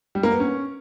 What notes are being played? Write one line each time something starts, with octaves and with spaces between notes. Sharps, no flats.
G3
A#3
B3
C#4